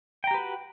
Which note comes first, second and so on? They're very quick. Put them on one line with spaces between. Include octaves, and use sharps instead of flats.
G5 A#5 G4 B4 F#4